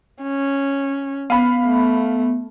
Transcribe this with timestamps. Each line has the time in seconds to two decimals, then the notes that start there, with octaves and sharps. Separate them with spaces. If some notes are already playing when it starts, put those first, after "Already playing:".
0.23 C#4
1.30 B3 F5 B5
1.66 A3